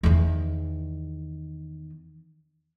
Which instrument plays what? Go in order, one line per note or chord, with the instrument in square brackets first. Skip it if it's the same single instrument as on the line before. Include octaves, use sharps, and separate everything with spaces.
[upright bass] E2 D#3